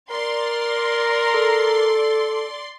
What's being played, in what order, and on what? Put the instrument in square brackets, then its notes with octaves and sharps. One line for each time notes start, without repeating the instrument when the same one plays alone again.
[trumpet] A#4 [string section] D5 C6
[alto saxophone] A4